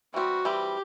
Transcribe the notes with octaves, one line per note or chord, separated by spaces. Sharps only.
E3 G3 C4 F#4
E3 G3 C4 G4